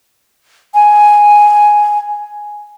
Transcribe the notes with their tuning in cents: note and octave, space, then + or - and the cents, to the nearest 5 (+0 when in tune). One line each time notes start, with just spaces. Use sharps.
G#5 +5